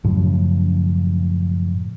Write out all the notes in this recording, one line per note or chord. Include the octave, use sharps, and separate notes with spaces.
F#2 A2 C#3 F3